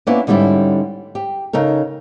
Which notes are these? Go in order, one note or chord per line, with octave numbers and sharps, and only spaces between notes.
A#3 B3 C#4 D4 E4 B4
G#2 D3 G3 C#4 E4
G4
C#3 D#4 A4 A#4